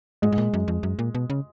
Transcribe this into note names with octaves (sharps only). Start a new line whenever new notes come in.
G#2 G#3
G#2
A#2
F#2
F2
F#2
A#2
B2
C#3